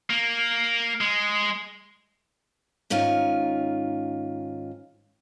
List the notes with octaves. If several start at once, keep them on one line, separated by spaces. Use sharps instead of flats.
A#3
G#3
G#2 D#3 C#4 F4